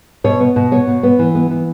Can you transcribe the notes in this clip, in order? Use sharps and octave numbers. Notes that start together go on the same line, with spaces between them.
B2 C#5
B3
B2
B3 C#5
B2
B3
E3
B3
E3